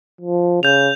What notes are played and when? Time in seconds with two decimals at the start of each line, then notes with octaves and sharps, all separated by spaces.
0.21 F3
0.63 C#3 G6 F7